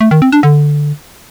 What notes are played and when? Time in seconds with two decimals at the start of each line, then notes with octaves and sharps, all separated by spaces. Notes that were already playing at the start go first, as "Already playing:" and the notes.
0.01 A3
0.11 D#3
0.22 C4
0.32 D4
0.43 D3